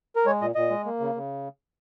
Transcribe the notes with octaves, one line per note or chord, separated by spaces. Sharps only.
A#4
G#3 C#5
A#2 D#5
A#2 D#5
G#3
A#3
C#3
C#3